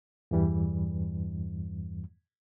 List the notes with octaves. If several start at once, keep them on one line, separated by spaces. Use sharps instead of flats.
E2 G2 E3 G3